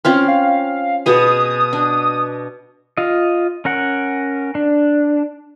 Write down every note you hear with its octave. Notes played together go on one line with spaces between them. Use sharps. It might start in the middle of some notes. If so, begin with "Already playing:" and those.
C4 C#4 F4 F6
F5
B2 B3 G#4 D#6
D4
F4 D#5
C#4 A#4 F#5
D4